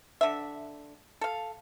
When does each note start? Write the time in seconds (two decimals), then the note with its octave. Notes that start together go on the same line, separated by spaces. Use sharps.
0.21 D3 E5
1.21 A4 F5